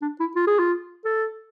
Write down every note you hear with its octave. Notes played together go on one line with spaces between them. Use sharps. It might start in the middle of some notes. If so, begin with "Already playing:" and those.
D4
E4
F4
G#4
F4
A4